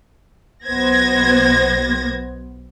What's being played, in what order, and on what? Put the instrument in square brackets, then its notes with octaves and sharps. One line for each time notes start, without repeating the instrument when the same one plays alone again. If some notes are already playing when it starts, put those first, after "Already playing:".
[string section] B1 B2 B3 C5 G#6 A#6